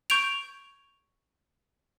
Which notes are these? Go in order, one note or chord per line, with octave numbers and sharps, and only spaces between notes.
C#6 G6 G#6 D7 F7